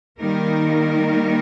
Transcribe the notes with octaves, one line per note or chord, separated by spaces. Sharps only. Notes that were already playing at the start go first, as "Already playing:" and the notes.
D#3 G3 A#3 D#4 A#4